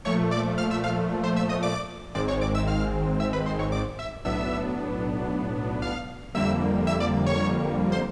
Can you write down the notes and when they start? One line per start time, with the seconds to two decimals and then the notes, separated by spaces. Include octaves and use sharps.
0.05 A#2 F3 A3 C#5 C#6
0.31 D5 D6
0.58 F5 F6
0.71 E5 E6
0.84 F5 F6
1.24 C5 C6
1.36 E5 E6
1.49 D#5 D#6
1.63 D5 D6
2.15 G#1 G#2 D#3 G#3 C4 D5 D6
2.28 C#5 C#6
2.41 D5 D6
2.55 E5 E6
2.67 F5 F6
3.20 E5 E6
3.33 B4 B5
3.46 C5 C6
3.59 C#5 C#6
3.72 D5 D6
3.99 E5 E6
4.25 B1 A2 F#3 B3 D4 E5 E6
5.82 F5 F6
6.35 F2 D3 G3 A#3 E5 E6
6.87 E5 E6
7.00 D5 D6
7.27 C#5 C#6
7.92 C5 C6